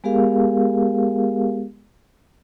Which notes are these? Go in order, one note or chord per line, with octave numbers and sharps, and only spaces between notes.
G#3 B3 G4 G#4 A#4 F5